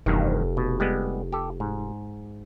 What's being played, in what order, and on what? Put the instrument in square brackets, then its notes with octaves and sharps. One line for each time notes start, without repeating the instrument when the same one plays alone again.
[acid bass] F1 [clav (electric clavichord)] E2 G2 D#3
[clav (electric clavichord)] B2
G3 G#3 B3
G4 A4
G#2